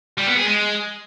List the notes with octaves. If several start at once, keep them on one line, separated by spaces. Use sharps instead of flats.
G3
B3
G#4
G#3